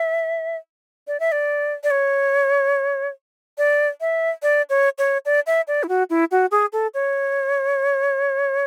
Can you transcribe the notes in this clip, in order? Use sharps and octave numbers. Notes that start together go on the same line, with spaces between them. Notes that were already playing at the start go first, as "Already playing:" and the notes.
Already playing: E5
D5
E5
D5
D5
C#5
D5
E5
D5
C#5
C#5
D5
E5
D5
E4
F#4
E4
F#4
G#4
A4
C#5